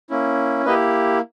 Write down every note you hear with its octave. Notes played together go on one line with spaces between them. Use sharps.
A#3 C#4 E4
A#3 E4 G4 B4 D#5